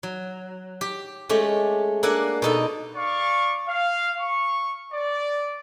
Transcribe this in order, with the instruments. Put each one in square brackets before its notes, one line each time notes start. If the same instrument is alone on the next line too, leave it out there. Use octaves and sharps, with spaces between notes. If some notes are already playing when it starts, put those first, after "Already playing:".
[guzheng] F#3
G4
G#3 A3 C#4 G4
A#3 D4 A4 F#5 G#5
B2 D#4 A4
[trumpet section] D5 F5 C#6
F5
C#6
D5